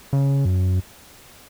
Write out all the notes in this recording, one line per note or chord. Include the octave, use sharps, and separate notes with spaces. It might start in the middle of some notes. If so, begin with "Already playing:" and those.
C#3
F#2